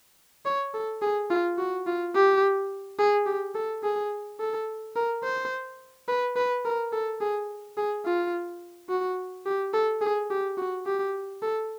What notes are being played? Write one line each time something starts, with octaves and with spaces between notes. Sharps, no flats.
C#5
A4
G#4
F4
F#4
F4
G4
G#4
G4
A4
G#4
A4
A#4
C5
B4
B4
A#4
A4
G#4
G#4
F4
F#4
G4
A4
G#4
G4
F#4
G4
A4